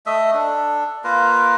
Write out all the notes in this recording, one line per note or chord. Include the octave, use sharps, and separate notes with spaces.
A3 D#5 E5
D4 A4
A#3 F4 A#4 B4